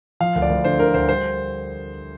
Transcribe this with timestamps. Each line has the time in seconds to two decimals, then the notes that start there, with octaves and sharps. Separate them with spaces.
0.20 F3 F5
0.35 D2
0.42 D5
0.50 D2
0.64 D3 C5
0.79 D3 A#4
0.94 D2 C5
1.08 G3 C5